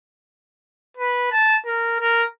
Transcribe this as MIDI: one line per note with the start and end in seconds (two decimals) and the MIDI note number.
0.97 1.28 71
1.32 1.56 81
1.66 1.99 70
2.00 2.24 70